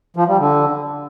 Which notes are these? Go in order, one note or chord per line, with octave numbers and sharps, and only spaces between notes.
F3
G3
D3